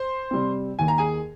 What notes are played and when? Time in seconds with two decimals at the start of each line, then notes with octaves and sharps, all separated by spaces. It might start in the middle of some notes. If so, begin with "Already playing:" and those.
Already playing: C5 C6
0.31 C3 G3 C4
0.79 D#2 D#3 A#3 G#5
0.88 A#5
0.98 G#4 G#5